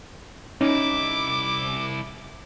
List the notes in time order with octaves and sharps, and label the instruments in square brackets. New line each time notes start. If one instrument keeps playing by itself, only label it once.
[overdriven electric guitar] C2 E4 [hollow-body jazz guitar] C#4 D#4 [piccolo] D6